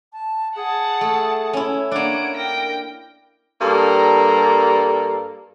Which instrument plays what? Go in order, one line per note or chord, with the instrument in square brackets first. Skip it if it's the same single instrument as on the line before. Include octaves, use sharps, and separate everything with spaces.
[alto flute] A5
[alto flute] G#4 [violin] F#5 A5
[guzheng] A3
C#4 E4
[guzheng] A#3 D4 [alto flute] C#5 [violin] F#5 D7
[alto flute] A#4 [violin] G5 A#6
[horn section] G2 G3 A#3 A4 A#5